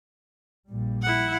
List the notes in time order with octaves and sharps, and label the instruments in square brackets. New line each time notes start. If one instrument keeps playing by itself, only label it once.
[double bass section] A#1 A#2 G3
[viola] E4 F#5